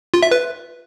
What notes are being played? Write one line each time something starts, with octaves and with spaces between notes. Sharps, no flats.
F4
E5
B4